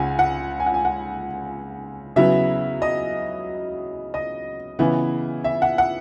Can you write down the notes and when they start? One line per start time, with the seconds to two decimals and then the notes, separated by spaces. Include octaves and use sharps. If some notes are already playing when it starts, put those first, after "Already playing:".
Already playing: C#2 C#3 F#5 G#5
0.19 F#5
0.60 G#5
0.66 F#5
0.74 G#5
0.85 F#5
2.16 C#3 F#3 B3 E4 E5
2.82 D#5
4.14 D#5
4.79 C#3 E3 B3 E4
5.44 E5
5.62 F#5
5.78 F#5